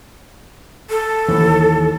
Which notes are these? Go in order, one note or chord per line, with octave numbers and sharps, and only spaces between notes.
A4
D#2 E3